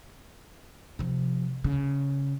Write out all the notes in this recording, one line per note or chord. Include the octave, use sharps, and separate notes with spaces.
C3 F3
C#3